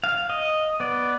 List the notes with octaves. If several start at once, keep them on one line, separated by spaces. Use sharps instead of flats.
F5
D#5
B3 D5